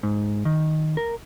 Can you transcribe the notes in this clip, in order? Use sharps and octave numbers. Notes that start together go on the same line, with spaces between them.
G#2
D#3
A#4